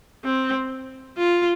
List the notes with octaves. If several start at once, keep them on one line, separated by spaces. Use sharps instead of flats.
C4
F4